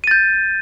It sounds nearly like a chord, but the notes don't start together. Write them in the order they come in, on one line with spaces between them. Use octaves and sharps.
D#7 A6 G6